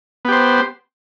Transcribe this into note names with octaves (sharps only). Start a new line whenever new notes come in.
B3 G4 C5